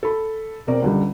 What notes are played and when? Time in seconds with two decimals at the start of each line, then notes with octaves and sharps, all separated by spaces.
0.03 A4 B5
0.67 E1 C4 A#4 D5
0.82 C#2 D3 G3